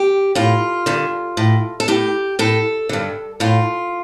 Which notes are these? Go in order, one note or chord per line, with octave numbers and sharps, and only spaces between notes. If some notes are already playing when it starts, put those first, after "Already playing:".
Already playing: G4
A2 F4
G2 D3
A2
A4
A2 G4
A2 A4
G2 D3
A2 F4